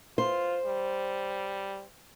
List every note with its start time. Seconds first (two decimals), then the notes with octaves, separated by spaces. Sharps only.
0.18 F4 C5
0.66 G3